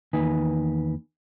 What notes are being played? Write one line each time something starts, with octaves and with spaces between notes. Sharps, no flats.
E2 D#3 A#3 D#4 B4 G#5